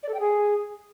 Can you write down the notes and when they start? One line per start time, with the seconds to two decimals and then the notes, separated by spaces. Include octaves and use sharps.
0.03 D5
0.08 A4
0.14 G5
0.19 G#4